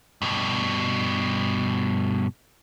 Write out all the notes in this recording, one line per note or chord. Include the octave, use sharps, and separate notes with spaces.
G2 B2